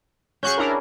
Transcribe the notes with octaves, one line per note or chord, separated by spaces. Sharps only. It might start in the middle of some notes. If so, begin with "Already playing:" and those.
C#4 F#4 G#4 C#6 F#6 G6
D4 E4 A#4